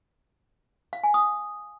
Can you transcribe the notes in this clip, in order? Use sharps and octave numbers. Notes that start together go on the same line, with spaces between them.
F5
G#5
D#6